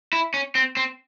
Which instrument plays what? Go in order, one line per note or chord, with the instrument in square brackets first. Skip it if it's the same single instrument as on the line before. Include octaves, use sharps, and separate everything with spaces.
[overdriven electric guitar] E4
C#4
C4
C4